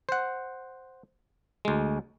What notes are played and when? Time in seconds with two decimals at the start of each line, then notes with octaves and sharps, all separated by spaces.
0.09 C5 F#5
1.65 D2 G#3